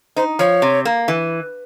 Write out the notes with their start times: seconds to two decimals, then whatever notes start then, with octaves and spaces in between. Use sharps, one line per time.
0.16 D#4 C5
0.39 F3 C#5
0.62 C3
0.85 A#3
1.08 E3